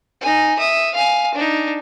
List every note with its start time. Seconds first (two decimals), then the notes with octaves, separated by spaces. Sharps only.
0.21 D#4 G#5
0.59 E5 D#6
0.94 F5 G#5
1.35 D4 D#4